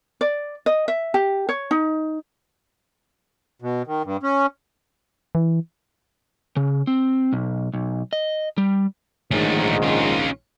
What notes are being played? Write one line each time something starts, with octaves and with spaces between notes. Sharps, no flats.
D5
D#5
E5
G4
C#5
D#4
B2
D#3
G2
C#4
E3
C#3
C4
B1
B1
D#5
G3
A#1 G#2 D#3 A3 C#4
C#4 F4